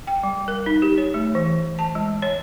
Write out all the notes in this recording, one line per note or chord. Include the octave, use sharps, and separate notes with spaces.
G5
G3
A#4
D#4
G4
C#5
A3
E3
A5
G#3
C#5